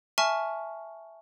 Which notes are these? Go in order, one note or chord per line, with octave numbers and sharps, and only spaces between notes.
E5 G#5 A5 C#6 F6